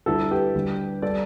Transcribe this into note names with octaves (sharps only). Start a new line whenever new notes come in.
D2 D3 G3 E4 A4
G4 B4
D2 D3 G3
G3 A4 D5